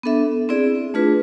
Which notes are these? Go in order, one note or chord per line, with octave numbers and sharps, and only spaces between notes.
B3 D4 A4 E5
C4 E4 G#4 D5
A3 D4 F4 G#4 B4